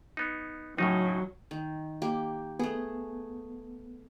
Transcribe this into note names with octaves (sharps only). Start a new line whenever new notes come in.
B3 D#4
A2 C#3 F#3 D#4
D#3
A#3 G4
A3 B3 G#4